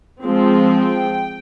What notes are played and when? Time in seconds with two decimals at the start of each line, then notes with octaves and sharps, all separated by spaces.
0.23 F3 G#3 C4
0.77 G5